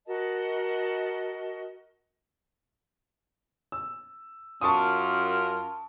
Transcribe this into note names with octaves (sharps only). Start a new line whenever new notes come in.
F#4 A#4 D#5 A5
E6
F#2 F4 A#4 A5 C#6 D#6